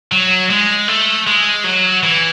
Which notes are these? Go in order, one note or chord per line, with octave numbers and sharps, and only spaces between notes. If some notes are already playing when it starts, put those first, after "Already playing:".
F#3
G#3
A3
G#3
F#3
E3